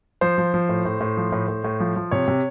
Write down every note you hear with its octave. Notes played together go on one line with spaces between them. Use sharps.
F3 C5
F3
F3
A2
A2
A2
F3
A2
A2
A2
F3
F3
C3 C#5
C3